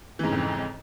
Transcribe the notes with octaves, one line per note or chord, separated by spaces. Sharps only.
F2 G#2 C#3 E3